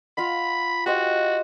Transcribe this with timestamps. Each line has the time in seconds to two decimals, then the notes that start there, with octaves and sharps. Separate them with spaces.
0.17 F4 F5 F#5 B5
0.86 F#4 G4 C5 D#5